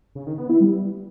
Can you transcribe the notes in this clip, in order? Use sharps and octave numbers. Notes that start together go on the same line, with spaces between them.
C#3
D#3
B3
E4
G3